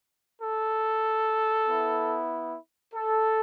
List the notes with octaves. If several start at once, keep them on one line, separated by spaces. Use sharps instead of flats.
A4
B3 E4
A4